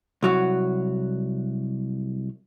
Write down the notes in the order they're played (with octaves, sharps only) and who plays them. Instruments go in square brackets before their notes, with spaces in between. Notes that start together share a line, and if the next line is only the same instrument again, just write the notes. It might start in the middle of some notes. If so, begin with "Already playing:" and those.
[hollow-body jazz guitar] C2 F#3 F#4